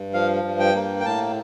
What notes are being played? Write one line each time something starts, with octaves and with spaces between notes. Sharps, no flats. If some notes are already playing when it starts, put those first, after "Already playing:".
Already playing: G2
F3 F5
G2
G5
A#3
G5
A2 A5